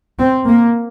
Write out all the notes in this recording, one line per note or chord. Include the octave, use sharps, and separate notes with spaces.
C4
A#3